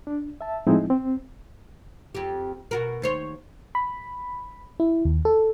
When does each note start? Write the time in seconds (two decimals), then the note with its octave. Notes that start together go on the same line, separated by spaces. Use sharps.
0.07 D4
0.41 E5 A5
0.67 A2 F3 G#3 C4 D#4 E4
0.90 C4
2.15 F2 G4
2.71 B2 F#4 A#4
3.02 D#2 C5 C#5
3.75 B5
4.80 E4
5.05 D#2
5.25 A4